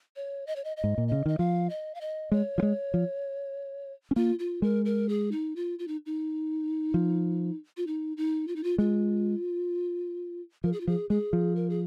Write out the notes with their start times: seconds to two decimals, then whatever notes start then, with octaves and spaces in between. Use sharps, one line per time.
0.16 C#5
0.47 D#5
0.56 C#5
0.64 D#5
0.77 D#5
0.84 G#2
0.98 A#2
1.08 C#3 D#5
1.26 D#3 D#5
1.39 F3 F5
1.70 D#5
1.95 F5
2.01 D#5
2.32 G#3 C#5
2.58 F3
2.62 G#3
2.94 F3
4.11 C#4
4.16 A#3 F4
4.39 F4
4.62 G#3 A#4
4.85 A#4
5.09 G#4
5.32 D#4
5.56 F4
5.79 F4
5.88 D#4
6.06 D#4
6.94 F3
7.77 F4
7.87 D#4
8.17 D#4
8.48 F4
8.56 D#4
8.63 F4
8.78 G#3 F4
10.64 F3 A#4
10.72 G#4
10.80 F4
10.87 F3 G#4
11.10 G#3 G#4
11.33 F3
11.56 A#4
11.70 G#4